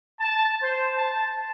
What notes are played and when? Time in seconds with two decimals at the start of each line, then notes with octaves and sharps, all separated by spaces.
0.20 A5
0.61 C5
0.96 A5